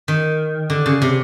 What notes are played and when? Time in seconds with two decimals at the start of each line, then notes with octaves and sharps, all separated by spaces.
0.08 D#3
0.70 D3
0.86 C#3
1.02 C3